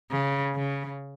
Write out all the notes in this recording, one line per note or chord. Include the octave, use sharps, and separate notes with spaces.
C#3
C#3